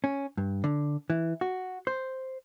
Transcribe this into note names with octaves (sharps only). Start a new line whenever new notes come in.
C#4
G2
D3
E3
F#4
C5